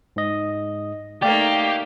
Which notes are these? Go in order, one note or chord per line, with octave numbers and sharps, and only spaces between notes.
G#2 D#5
A3 A#3 D#4 G4 D5 F5 G5